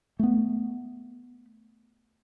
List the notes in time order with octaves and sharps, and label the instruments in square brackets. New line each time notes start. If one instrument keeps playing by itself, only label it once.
[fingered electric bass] A3 B3